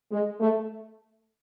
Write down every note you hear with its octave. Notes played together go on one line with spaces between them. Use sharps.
G#3
A3